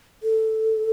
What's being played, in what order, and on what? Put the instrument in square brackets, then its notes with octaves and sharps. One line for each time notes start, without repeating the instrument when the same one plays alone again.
[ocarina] A4